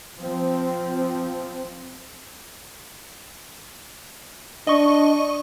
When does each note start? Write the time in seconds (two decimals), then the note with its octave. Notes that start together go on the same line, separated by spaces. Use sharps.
0.19 F3 C4
4.67 D4 D#5 C#6